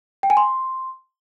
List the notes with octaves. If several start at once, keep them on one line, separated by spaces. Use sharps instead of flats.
G5
G#5
C6